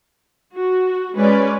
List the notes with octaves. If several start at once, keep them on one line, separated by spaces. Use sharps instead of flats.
F#4
G#3 C#4 B4 D5